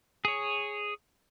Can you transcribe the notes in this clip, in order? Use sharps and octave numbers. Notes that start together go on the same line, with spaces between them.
G#4 C#5